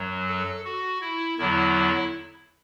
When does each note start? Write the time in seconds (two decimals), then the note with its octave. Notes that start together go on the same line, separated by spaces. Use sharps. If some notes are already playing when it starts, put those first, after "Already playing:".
Already playing: F#2 F#3
0.28 A4
0.65 F#4
1.01 E4
1.38 E2 D3 F#3 E4